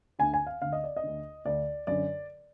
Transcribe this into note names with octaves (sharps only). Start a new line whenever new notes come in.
D2 D3 G#5
G#5
F5
D2 D3 F5
D#5
D5
D#5
D2 D3
D2 D3 D5
F#2 D3 D5